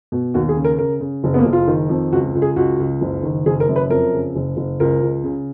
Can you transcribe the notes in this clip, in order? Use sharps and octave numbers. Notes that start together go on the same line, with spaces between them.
B2
D#2 F#4
G#4
C#3
A#4
C#3 A#4
C#3
F#1
B3
A#3
F#1
F4
D#3
F2
C#2 F#4
C#2
G#4
C#2 F#4
C#2
F#1
D#3
F#1 G#4
A#4
F#2
B4
F2 A#4
C#3
F#1
F#1
C#2 A#4
C#2
C#3